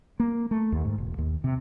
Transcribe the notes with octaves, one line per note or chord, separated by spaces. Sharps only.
A#3
A3
D#2
G#2
E1
D#2
C3